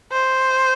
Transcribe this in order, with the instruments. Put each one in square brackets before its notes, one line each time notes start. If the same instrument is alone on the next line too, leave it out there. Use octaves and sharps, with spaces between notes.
[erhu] C5